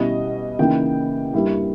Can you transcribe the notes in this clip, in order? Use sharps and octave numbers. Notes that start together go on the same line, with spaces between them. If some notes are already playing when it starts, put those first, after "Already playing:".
Already playing: B2 G3 C#4 E4 D#5
C#3 E3 A#3 D#4 G5
G2 G3 A#3 E4